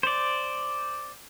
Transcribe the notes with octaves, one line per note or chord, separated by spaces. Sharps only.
C5 D5